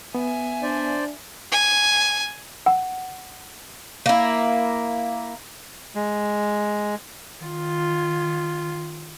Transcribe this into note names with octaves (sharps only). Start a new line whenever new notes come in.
B3 E5 G#5
D4 C5 D5
G#5
F#5
A#3 E4
G#3
D#3 F4